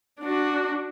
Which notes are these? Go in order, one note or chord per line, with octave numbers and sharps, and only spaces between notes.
D4 F#4